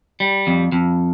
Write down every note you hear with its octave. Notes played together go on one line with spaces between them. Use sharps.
G3
F2
F2